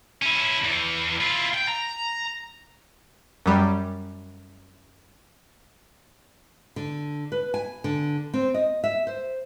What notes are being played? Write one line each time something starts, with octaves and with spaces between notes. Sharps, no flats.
C#4 E4
E2 E3
E4 F4
G5
A#5
F#2 G3
D3
B4
G#5
D3
C4
D#5
E5
C5